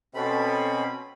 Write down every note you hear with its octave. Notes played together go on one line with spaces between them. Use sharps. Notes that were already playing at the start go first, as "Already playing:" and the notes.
B2 C4 C#4 A4 B5